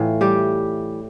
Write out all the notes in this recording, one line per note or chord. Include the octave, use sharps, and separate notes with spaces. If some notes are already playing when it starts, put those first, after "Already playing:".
Already playing: A2 E3 F4
G3 G4